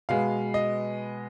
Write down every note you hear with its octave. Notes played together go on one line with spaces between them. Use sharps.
B2 G#3 B3 F5
D#5